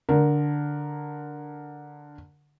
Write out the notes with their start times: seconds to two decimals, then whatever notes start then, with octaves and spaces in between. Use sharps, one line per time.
0.09 D3 A#4